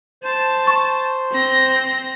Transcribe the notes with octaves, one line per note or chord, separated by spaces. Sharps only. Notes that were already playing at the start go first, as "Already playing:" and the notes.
C5 A5
C#6
C4 A#6